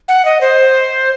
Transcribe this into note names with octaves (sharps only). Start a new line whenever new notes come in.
F#5
D#5
C5